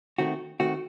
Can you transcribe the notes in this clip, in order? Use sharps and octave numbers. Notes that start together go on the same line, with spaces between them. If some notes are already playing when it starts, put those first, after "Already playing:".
D#3 A3 C4 F#4
D#3 A3 C4 F#4